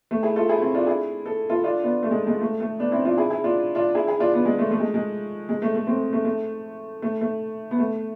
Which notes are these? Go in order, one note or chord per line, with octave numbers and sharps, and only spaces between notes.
A3
E4 G#4
F4 A4
E4 G#4
C4 E4
D4 F4
E4 G#4
A4
F4 A4
D4 F4
B3 D4
A3
G#3
G#3
A3
A3
B3 D4
C4 E4
D4 F4
E4 G#4
E4 G#4
D4 F4
D4 F4
E4 G#4
E4 G#4
D4 F4
B3 D4
G#3
A3
A3
G#3
G#3
G#3
A3
A3
A3 C4
A3
A3
A3
A3
B3
A3